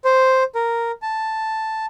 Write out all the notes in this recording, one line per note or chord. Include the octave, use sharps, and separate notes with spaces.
C5
A#4
A5